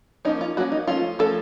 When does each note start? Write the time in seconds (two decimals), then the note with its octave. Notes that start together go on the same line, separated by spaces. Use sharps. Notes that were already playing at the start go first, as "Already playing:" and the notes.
0.25 F3 A#3 C#4 D#4
0.41 F4
0.57 F3 A#3 C#4 F#4
0.72 D#4
0.87 F3 A3 C#4 F4
1.19 F3 A3 C#4 A4